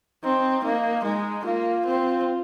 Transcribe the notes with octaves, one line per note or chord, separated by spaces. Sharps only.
C4 D#4
A#3 D#4
G#3 D#4
A#3 F4
C4